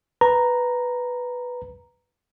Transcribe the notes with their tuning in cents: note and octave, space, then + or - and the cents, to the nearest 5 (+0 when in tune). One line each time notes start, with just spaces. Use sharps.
B4 +0 A#5 +0